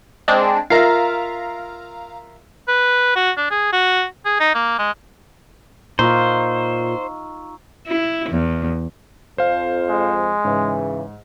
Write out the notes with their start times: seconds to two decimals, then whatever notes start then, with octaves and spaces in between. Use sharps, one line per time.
0.28 G#3 C4 D4
0.70 F4 A#4 E5 F5 A#5
2.68 B4
3.16 F#4
3.37 D4
3.51 G#4
3.73 F#4
4.25 G#4
4.40 D#4
4.55 A#3
4.78 G#3
5.99 A#2 D#4 F4 C5 A#5 C#6 E6
7.87 E4
8.29 E2
9.38 F2 F3 C5 F5
9.90 G#3
10.45 G#2 C#3 E3